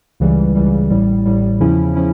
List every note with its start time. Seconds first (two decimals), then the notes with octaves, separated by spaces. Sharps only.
0.20 C#2 C#3 E3 G3
0.55 C#2 C#3 E3 G3
0.90 A1 A2 G3
1.26 A1 A2 G3
1.60 E2 C#3 F3 C#4 E4
1.95 F3 C#4 E4